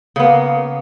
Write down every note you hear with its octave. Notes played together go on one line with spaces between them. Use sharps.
C#3 A#3 B3